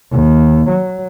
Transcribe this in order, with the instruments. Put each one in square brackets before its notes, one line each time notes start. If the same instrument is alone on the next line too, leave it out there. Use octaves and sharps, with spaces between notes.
[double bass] D#2
F#3